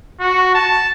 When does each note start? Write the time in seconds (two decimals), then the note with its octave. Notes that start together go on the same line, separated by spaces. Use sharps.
0.20 F#4
0.54 A5